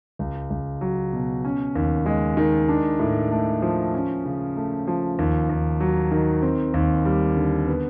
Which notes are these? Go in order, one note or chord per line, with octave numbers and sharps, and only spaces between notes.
C#2
C#2
F#3
B2
C#4
D#2
G#3
D#3
D4
A2
A3
F3
C#4
C#3
A3
F3
D#2
D#2
F#3
D#3
C4
D#2
G3
D3
B3